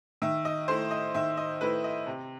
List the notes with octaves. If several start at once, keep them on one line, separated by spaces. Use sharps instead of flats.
D#3 E5
D#5
A3 E4 C5
D#5
D#3 E5
D#5
A3 E4 B4
D#5
C3